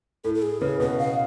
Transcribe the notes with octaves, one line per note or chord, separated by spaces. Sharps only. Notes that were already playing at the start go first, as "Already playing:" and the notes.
A2 A4
A4
G#4
C#3 B4
B2 B4
F5